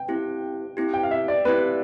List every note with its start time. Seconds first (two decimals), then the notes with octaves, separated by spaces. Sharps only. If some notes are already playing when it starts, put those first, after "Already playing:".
Already playing: G5
0.08 C4 E4 G4
0.77 C4 E4 G4
0.94 G5
1.03 F5
1.11 E5
1.28 D5
1.45 C4 E4 G4 B4